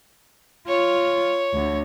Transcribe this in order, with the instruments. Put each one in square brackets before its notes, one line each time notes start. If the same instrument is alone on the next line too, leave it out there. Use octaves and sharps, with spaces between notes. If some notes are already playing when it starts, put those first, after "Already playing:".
[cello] F4 [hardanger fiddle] C#5
[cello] D2 D3